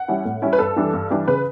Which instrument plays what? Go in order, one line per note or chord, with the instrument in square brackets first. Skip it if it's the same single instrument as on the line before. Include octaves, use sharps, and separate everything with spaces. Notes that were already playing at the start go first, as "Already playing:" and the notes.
Already playing: [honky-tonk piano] F#5
G3 C#4 E4
A2
G3 C#4 E4
B4
G2 A4
E3 G3 D4
G2
E3 G3 D4
C#3 B4